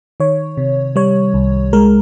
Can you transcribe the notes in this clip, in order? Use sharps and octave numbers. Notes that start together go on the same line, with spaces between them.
D#3 C#5
C3
G3 C#5
C2
G#3 A#4